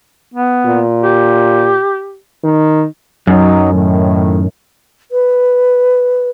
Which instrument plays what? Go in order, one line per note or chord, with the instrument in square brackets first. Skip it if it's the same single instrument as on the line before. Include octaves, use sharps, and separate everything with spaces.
[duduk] B3
[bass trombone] A#2
[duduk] G4
[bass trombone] D#3
[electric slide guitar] F#2 [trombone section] F#3 D#4
[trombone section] A2 D#3
[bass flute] B4